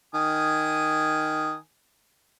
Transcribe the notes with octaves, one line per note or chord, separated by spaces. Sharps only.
D#3 G#5 D#6